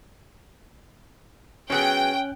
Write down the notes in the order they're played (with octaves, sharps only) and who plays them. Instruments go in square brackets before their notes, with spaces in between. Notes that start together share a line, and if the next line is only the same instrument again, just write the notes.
[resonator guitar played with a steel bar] F#3 B3 G#4 [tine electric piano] C#4 F#6 [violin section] G5